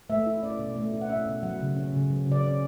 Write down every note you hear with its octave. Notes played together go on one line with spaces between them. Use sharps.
A3 E5
E4
C#4 D5
B2
A3
E4
F#5
C#4 E5
B2
F#3 F#5
C#3
C#4
C#3
F#3
C#3
D5
C#4